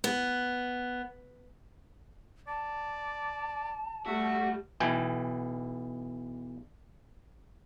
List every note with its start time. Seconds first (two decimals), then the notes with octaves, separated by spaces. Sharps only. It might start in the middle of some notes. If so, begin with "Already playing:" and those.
0.04 B3
2.48 D5 A5
4.06 G3 A3 F#4 E5
4.80 B1 B2 E3 G5 G#5